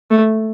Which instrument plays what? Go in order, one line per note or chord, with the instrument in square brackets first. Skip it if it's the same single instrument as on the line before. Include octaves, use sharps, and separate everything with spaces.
[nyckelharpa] A3